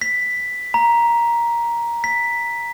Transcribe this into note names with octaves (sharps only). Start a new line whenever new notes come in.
B6
A#5
B6